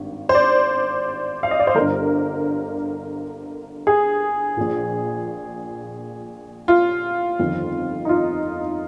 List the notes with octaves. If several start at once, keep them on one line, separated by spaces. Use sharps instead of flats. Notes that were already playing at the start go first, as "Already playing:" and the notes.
Already playing: G#1 G2 D#3
C5
D5
F5
D#5
D5
C5
G1 G2 D3 A#4
G#4
A#1 A#2
F4
G1 F2 D#3
D#4
F4